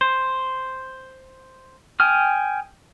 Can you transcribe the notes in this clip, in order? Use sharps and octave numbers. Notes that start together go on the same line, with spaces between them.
C5
G5 G#5 D#6 F6